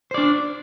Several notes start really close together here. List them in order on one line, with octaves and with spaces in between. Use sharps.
C5 D5 D4